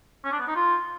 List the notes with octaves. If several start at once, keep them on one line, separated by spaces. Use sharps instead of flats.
C#4
D4
B3
D#4
F4